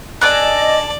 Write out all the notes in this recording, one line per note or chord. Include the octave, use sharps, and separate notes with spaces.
D4 A4 D5 D#5 G#5 F#6